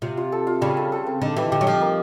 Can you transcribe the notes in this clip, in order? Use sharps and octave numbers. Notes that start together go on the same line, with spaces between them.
C3 F4
F4
A4
F4
C#3 G3
A4
A4
C4
D3 D#4
E3 G4
D3 G4
F#3
F3 G4
A#3